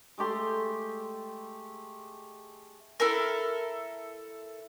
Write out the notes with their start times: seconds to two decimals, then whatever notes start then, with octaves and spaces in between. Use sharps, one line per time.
0.18 G#3 A3 G4 C6
3.00 E4 A4 A#4